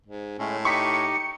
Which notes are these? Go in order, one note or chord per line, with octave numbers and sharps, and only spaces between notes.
G#2
A2 G#3 A3 C#4
D#4 G4 D#5 C#6 B6 C#7